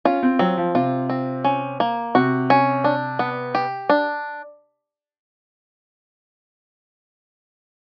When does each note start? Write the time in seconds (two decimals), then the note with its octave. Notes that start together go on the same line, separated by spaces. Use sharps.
0.05 C#4 F4
0.23 C4
0.39 F#3 C4
0.57 F3
0.75 C3 F4
1.09 C4
1.44 C#4
1.80 A#3
2.15 C3 F#4
2.50 C#4
2.84 D4
3.19 B3
3.55 G4
3.89 D4